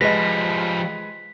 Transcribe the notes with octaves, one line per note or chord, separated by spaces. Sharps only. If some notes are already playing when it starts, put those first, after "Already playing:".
F3 G3 G#3 B4 D#5 A#6 B6